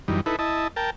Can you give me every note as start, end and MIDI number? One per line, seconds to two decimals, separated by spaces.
0.08 0.21 42
0.08 0.21 52
0.08 0.21 55
0.08 0.21 63
0.26 0.36 63
0.26 0.36 64
0.26 0.36 69
0.26 0.36 71
0.39 0.68 64
0.39 0.68 75
0.39 0.68 81
0.76 0.90 70
0.76 0.90 79
0.76 0.90 81